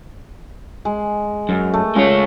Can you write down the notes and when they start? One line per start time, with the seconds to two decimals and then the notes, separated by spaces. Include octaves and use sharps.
0.85 G#3
1.49 F#2
1.73 A3
1.96 G#3 C#4 F4 C#5